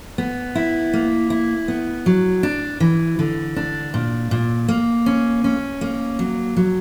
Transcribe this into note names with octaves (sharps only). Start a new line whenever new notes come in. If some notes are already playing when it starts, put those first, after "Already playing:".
B3
E4
A#3
E4
B3
F#3
D4
E3
D3
D4
A#2
A#2
A#3
C#4
C#4
A#3
F#3
F#3